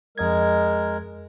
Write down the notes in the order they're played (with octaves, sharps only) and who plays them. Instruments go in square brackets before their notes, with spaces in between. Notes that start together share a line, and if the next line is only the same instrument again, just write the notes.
[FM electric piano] F2 D#5 G#6 [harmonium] G#3 A#4